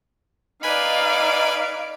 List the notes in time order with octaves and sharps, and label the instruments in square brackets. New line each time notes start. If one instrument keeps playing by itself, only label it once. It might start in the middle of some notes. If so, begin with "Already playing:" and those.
[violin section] D#4 D5 D7 [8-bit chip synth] B4 G#5 B5 [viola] F5